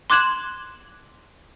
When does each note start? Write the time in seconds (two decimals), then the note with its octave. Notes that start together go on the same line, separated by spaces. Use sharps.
0.10 C6 D6 F#6 G#6 E7 F#7